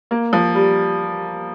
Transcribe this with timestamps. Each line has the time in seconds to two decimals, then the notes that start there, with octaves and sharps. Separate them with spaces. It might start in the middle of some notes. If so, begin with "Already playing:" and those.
0.11 A#3
0.33 F3
0.55 G3